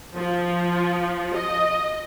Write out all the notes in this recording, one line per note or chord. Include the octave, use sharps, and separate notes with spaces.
F3
D#5